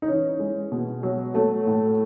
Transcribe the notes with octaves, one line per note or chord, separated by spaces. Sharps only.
D#4
E3 C#4
G#3
B2
F#3
F#3 A3
A2